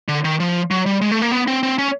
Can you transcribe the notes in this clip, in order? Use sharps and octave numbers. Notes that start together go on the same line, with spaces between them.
D3
D#3
F3
F#3
G3
G#3
A3
A#3
B3
C4
C4
C#4